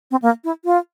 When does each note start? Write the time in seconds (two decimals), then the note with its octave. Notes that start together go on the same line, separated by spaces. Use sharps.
0.11 C4
0.22 A#3
0.44 E4
0.65 F4